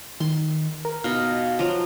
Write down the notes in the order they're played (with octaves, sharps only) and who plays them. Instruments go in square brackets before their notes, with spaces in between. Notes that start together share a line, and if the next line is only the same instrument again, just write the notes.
[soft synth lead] D#3 [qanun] C6
[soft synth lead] A#4
[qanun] B2 D#4 [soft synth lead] F5
[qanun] F3 F#3 F4